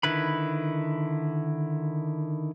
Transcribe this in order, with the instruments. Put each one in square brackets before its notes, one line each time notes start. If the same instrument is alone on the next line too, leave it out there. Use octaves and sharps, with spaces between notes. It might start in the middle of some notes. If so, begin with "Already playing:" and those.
[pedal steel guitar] D3 D#3 E4 B4 B5